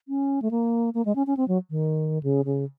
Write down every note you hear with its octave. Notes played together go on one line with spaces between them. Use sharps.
C#4
A3
A#3
A#3
G#3
C#4
C#4
C4
F#3
D#3
C#3
C#3